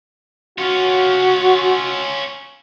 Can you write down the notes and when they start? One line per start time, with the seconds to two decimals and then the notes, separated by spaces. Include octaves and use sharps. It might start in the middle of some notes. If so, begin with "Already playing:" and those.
0.58 C#4 F4 F#4